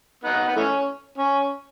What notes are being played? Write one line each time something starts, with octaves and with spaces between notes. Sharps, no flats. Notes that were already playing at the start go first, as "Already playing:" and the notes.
B3 D#4
B3
E3 A3 C#4
C#4